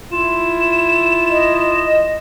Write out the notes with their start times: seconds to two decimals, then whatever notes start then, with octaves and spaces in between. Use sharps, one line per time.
0.12 E4 F4 E7
1.31 D#5